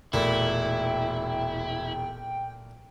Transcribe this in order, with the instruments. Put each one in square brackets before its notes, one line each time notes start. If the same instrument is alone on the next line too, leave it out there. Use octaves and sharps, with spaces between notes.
[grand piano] E1 [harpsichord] A#2 A3 [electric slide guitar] E4 [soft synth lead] G5